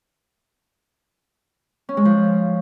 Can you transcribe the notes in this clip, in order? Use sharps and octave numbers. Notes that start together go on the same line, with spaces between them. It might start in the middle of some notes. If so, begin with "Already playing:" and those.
C#4
G#3
F3